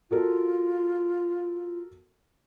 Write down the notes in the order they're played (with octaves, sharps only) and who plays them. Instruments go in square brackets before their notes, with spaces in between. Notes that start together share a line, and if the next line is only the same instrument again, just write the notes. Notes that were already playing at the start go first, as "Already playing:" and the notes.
[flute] F4 [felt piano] F#4 A4 A#4